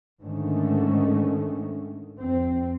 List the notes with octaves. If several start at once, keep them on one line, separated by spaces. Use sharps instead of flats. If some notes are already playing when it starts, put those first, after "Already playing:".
G#2 D3 D#3 G#3 A3 C#4
F2 C4